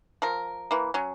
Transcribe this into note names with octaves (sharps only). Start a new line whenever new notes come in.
F3 A#4
E3 A#3
F#3 C#4